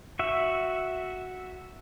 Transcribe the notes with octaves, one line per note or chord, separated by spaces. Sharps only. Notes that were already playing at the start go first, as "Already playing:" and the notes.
F#4 E5